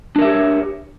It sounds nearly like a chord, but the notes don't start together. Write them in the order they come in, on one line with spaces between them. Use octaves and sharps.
D4 A#4 E5 G4 C#5